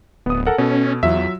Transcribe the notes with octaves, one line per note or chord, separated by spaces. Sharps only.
D1 B3 D#6
A4 A#4 F#5
B2 C#4 A4
E2 F#3 F4 E5